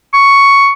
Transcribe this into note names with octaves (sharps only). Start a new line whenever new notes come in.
C#6